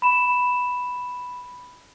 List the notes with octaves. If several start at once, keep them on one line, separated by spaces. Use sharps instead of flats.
B5 E7